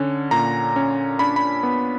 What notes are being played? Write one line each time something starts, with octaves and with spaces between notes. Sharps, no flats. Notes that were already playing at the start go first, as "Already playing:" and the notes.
Already playing: D3 C#4
A#2 A#5
C#4
D4 B5
B5
B3